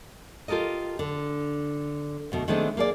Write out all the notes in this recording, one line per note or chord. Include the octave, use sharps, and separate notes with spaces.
F4 G4 A4 A#4 D#5
D3
D2 B2 A3
D#3 G#3 A3 B3 C4 D4
A#3 G#4 D5